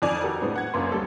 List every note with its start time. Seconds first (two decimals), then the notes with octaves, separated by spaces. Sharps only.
0.02 F2 D#3 D5 G#5 F7
0.23 F#4 G4 A4 A#4
0.40 A2 G#3 B3 C4 D4
0.56 F#5 G#6
0.74 F#1 F#2 A#3 B4 C6
0.92 D2 G3 C#4 A4